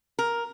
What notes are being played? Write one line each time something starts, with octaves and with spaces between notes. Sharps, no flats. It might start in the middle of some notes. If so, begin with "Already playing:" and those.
A#4